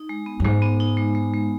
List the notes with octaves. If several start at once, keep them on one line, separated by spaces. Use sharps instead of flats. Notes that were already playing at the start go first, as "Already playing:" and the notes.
Already playing: D#4
G#3
B3
F#2
G#2 G#3
B3
D#4
G#3
G#3
G#3